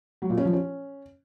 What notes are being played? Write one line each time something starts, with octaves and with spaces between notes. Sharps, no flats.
F#3
A#2
C#4
F3
C#4